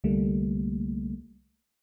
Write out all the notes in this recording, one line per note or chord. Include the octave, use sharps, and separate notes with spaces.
C2 D3 G3 A3 A#3